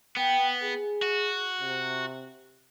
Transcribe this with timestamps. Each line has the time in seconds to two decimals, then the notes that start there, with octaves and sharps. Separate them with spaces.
0.17 B3 G5
0.63 G#4
1.02 F#4
1.61 C3